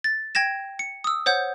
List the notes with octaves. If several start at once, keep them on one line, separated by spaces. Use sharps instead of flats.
A6
G5 G#6 A#6 E7
C#7
D#6 E6
C5 C#5 F#5 G6